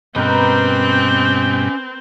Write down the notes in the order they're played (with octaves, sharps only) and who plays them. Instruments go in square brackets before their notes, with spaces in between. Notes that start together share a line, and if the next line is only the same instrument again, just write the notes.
[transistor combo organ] G2 B2 G5 [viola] C4 [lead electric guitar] C#4 D#5 [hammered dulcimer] A#4 B4